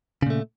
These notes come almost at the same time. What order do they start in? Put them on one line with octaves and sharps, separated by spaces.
C#3 A#2 A3